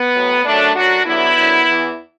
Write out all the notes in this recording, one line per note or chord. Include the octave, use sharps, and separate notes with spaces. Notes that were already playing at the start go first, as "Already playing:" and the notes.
Already playing: B3
A2 F#3
F#2 D3 F#3 A3 D4
F#2 D3 F#3 D4 F#4
E2 D3 F#3 B3 E4
F#2 D3 F#3
E2 E3